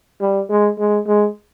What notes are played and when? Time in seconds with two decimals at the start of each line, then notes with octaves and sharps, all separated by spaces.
0.21 G3
0.49 G#3
0.79 G#3
1.06 G#3